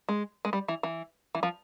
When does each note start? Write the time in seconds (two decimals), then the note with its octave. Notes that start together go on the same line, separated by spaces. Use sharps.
0.09 G#3
0.45 G#3
0.53 G3
0.68 E3
0.83 E3
1.35 E3
1.43 F3